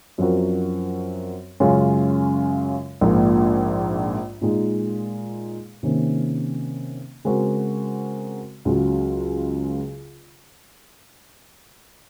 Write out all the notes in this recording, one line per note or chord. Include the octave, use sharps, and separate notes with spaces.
F#2 F3 C4 F#4 A#4
F#2 C#3 G#3 C#4 F4
A#1 G#2 F3 A#3
A#2 G#3 D#4 G#4
C3 D#3 A#3 C#4
C#3 G#3 C4 F#4 A#4
C#2 C#3 F#3